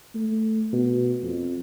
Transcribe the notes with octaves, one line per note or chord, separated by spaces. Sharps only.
A3
B2
F2